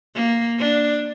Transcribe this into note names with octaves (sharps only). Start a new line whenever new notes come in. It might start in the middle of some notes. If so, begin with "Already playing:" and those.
A#3
D4